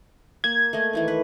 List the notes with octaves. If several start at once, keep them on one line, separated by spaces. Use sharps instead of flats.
A#3 G#6
A3 A#3 D#5
D#3 E3 A3
B4